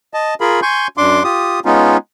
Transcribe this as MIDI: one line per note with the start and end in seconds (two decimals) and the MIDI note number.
0.14 0.34 75
0.14 0.34 81
0.41 0.60 65
0.41 0.60 68
0.41 0.60 70
0.41 0.60 83
0.62 0.87 80
0.62 0.87 84
0.62 0.87 85
0.62 0.87 91
0.98 1.23 42
0.98 1.23 62
0.98 1.23 84
0.98 1.23 86
1.24 1.60 65
1.24 1.60 67
1.24 1.60 87
1.65 1.97 56
1.65 1.97 59
1.65 1.97 61
1.65 1.97 63
1.65 1.97 65